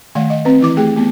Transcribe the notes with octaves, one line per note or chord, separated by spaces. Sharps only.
D#3 A3 D5 F5 F#5
D#5
C4 B4
E3 E4 D6
A3 G4 G#4 G5
A3 B3